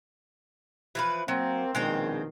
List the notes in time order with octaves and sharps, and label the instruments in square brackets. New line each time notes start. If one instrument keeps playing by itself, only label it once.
[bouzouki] E3 F3 B4
[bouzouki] F#3 [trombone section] A#3 C4
[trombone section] A#1 B2 D#3 [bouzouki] G#3 C4 G5